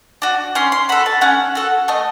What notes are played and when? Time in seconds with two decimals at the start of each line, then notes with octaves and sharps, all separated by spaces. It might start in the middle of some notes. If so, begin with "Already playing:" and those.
0.22 D4 F#4
0.55 C#4 C6
0.72 C6
0.89 F#4 A4 B5
1.06 A5
1.21 C#4 F#5
1.55 F#4 A4
1.88 A3 D#5